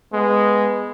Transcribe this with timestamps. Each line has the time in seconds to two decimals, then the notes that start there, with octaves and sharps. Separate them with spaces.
0.13 G#3 B3